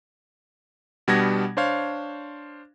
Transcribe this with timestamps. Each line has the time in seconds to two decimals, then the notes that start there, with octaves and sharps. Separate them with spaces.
1.08 B2 G3 B3 D4 G#6 A#6
1.57 D4 C5 C#5 F5